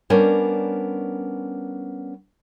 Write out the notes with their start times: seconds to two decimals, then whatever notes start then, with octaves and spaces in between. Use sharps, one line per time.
0.10 G3 B3 C#4 D4 A#4